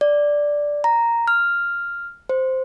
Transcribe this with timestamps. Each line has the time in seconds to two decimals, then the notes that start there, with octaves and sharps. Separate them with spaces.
0.01 D5
0.84 A#5
1.28 F6
2.29 C5